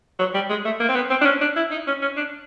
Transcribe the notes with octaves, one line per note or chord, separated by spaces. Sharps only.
F#3
G3
G#3
A3
A#3
C4
B3
C4
D4
C#4
D4
E4
D#4
C#4
C#4
D4